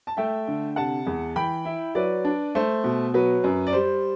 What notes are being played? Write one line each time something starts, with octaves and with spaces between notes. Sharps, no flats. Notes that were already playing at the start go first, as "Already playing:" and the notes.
A5
A3 E5 G5
D3
C3 F#5 A5
E2
E3 G5 B5
E4
F#3 B4 D5
D4
A3 C5
B2
F#3 B4
F#2
D5
G3 C5